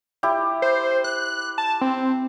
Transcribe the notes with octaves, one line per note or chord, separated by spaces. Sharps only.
E4 G4
C5
F#6
A5
C4